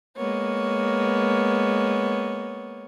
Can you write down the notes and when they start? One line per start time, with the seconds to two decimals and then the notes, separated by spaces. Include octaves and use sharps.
0.16 G#3 A#3 B3 C#5